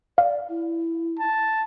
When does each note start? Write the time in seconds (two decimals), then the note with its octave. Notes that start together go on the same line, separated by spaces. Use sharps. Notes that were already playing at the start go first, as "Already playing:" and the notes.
0.18 D5 F5
0.49 E4
1.19 A5